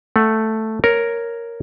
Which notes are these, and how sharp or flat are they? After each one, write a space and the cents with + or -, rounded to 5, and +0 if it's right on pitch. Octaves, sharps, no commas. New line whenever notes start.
A3 +0 F#5 +0
A#4 +0 C#5 +0